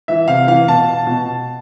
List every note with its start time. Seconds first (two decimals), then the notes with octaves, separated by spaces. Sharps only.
0.08 E3 E5
0.28 C3 F5
0.47 E3 F5
0.68 B2 A5
1.07 B2